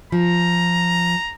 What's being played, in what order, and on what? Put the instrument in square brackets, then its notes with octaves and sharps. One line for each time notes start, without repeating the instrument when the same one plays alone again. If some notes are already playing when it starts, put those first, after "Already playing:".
[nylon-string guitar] F3 [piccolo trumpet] A#5